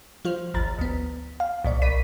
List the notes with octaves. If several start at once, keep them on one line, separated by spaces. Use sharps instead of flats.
F3 F4 C5
G#1 D#2 F3 A#5 A6
D2 B3
F5
C2 A#2 D5
A#1 D5 B6 D#7